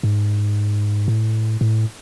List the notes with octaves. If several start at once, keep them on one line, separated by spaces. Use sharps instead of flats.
G#2
A2
A2